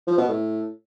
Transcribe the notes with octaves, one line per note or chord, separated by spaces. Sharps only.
F3
B2
A2